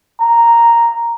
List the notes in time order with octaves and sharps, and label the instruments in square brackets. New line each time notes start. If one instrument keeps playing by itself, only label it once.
[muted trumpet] A#5